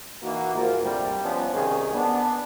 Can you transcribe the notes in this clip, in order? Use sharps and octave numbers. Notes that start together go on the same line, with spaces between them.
E3 A#3 D#4 F#4
D2 G#2 F3 A#3 F4 A#4
D2 G2 C3 G3
F3 B3 C#4 D4
C2 C3 D#3 C#4 G#4
B3 D4